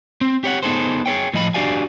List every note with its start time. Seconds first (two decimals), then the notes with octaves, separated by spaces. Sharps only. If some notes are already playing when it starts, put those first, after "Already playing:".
0.21 C4
0.44 G4 C#5 F#5
0.63 B3 D#4 G#4 A4 C5
1.06 G#4 B4 C#5 G5
1.34 A2 F3 D#5 F#5 B5
1.54 D4 F#4 G4 D5 F5 G#5